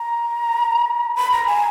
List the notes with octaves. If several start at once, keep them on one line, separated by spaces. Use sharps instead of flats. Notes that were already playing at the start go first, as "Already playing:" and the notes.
Already playing: A#5
B5
A#5
G#5